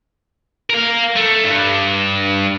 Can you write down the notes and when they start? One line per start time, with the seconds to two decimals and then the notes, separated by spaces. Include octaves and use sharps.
0.70 A#4 F5
1.16 A3
1.44 G2